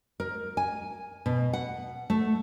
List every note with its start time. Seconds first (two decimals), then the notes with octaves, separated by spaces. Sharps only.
0.20 A#4
0.57 G#5
1.26 B2
1.53 F#5
2.10 A3